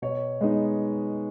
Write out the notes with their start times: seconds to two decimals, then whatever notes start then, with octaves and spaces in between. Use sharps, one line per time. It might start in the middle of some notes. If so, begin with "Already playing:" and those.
0.02 B2 C#5
0.41 G#3 B3 D#4